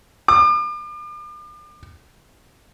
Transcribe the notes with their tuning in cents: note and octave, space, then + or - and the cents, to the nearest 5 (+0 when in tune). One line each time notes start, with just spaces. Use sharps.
D6 +40